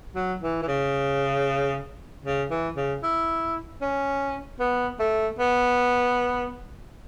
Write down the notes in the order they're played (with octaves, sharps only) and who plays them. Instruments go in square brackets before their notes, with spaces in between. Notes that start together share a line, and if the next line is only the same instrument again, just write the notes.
[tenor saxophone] F#3
E3
E3
C#3
C#3
E3
C#3
E4
C#4
B3
A3
B3